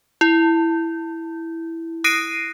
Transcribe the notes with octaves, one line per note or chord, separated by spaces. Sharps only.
E4
D#6 F#6 A#6 C7 D7 D#7